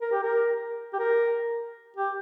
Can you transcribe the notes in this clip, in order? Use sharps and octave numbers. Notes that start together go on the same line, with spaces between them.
A#4
G4
A#4
G4
A#4
G4